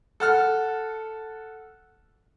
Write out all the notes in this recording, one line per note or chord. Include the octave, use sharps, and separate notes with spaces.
A4 F#5 F6